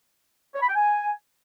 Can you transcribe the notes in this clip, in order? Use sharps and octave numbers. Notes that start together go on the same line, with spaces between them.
C#5
B5
G5
G#5